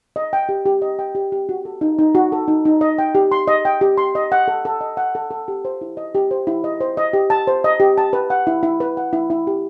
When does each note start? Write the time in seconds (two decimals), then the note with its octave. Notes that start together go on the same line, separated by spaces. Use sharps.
0.16 D#5
0.33 G5
0.49 G4
0.66 G4
0.82 D#5
0.99 G5
1.15 G4
1.32 G4
1.49 F#4
1.65 A4
1.81 D#4
1.99 D#4
2.15 F#4
2.32 A4
2.48 D#4
2.65 D#4
2.81 D#5
2.98 G5
3.15 G4
3.32 C6
3.48 D#5
3.65 G5
3.81 G4
3.98 C6
4.15 D#5
4.32 F#5
4.48 A4
4.65 A4
4.81 D#5
4.97 F#5
5.15 A4
5.31 A4
5.48 G4
5.65 C5
5.81 E4
5.97 D#5
6.15 G4
6.31 C5
6.47 E4
6.64 D#5
6.81 C5
6.97 D#5
7.13 G4
7.30 A5
7.47 C5
7.64 D#5
7.80 G4
7.98 A5
8.13 B4
8.30 F#5
8.47 E4
8.63 E4
8.80 B4
8.97 F#5
9.13 E4
9.30 E4
9.47 G4